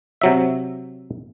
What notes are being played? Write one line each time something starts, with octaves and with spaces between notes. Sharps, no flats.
C3 F#3 E5